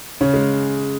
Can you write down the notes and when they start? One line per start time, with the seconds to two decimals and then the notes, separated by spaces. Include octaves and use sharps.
0.21 C#3 C#4
0.34 G#3